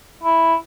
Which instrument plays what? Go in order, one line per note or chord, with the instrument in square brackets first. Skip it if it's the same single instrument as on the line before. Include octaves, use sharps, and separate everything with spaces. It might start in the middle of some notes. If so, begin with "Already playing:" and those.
[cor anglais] E4